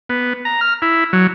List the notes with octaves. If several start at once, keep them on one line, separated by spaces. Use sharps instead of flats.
B3
A#5
F6
E4
F#3